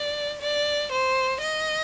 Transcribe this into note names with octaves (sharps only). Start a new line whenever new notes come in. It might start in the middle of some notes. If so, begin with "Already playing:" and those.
Already playing: D5
D5
C5
D#5